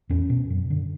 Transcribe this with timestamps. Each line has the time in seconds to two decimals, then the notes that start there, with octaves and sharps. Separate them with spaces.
0.09 E2 C#4
0.30 B2
0.50 F#2
0.70 D3